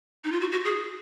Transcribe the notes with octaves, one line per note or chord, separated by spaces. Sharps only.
D#4
F4
F#4
F#4
G#4